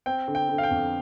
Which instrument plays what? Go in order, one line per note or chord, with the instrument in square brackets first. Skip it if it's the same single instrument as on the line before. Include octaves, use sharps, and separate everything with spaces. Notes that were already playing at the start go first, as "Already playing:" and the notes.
[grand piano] C4 G5
D3
G5
D3
F5
G5
F2